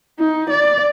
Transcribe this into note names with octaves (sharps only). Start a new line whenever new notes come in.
D#4
D5